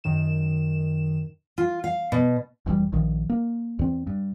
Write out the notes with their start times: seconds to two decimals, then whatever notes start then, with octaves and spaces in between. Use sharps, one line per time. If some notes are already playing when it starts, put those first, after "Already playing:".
0.04 F#2 D#3 E7
1.58 F4
1.84 F5
2.12 B2
2.66 F1 E2 A#2 G3
2.93 A#1 D#3 F3
3.29 A#3
3.79 E2 C4
4.07 G2